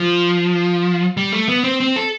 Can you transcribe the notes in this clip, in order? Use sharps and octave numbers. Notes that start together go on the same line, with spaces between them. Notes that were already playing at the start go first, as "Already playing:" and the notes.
Already playing: F3
G3
A3
B3
C4
C4
A4